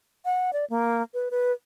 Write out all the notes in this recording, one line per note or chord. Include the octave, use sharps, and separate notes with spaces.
F#5
D5
A#3
B4
B4